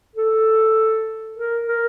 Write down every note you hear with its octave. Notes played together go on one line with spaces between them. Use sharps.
A4
A#4
A#4